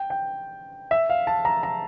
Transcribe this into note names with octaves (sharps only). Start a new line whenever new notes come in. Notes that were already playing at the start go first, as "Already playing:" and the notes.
Already playing: G5
G5
E5
F5
A5
A#5
A#5